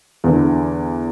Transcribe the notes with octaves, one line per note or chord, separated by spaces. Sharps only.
E2 D3